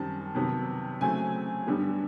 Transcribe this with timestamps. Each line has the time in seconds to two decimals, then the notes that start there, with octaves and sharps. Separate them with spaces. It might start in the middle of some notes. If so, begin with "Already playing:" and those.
Already playing: F#2 D#3 G3 C4 A5
0.35 C3 D#3 F#3 B3
1.01 C#3 F#3 A3 C4 G#5
1.67 G2 D3 G3 B3